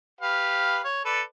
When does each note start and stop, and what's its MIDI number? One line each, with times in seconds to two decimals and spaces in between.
0.21 0.83 67
0.21 0.83 71
0.21 0.83 77
0.84 1.02 73
1.05 1.22 69
1.05 1.22 71
1.05 1.22 74